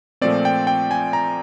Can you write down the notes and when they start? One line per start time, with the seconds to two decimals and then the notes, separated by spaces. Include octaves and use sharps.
0.21 A#2 F3 A3 C4 D5
0.45 G5
0.67 G5
0.91 G#5
1.13 A#5